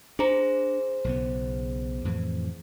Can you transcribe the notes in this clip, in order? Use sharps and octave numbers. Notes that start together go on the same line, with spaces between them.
D4 G#4 C5 A#5
B1 C#3 B3
F2 A2 E3